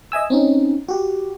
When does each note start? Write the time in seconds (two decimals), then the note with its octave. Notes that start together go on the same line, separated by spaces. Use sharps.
0.12 D#5 E5 G#5 E6
0.30 C4 C#4 D#4
0.88 F#4 G4